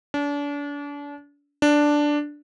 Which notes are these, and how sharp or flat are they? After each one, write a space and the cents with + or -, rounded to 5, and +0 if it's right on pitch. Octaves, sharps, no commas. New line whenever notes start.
D4 -35
D4 +0